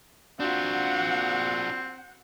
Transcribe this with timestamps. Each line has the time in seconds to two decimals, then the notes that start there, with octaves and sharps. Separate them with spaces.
0.40 C4 D4 F4 F#4 F#5